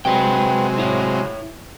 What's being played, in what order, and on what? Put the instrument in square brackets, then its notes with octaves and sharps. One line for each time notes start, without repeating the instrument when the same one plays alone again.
[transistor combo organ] C3 F#3 G#3 [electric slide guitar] B4 G5
[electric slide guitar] E4 C#5